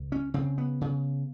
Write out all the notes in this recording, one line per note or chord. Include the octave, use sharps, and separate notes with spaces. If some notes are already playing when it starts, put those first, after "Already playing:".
Already playing: C#2
C#4
C#3 C4
B3
C#3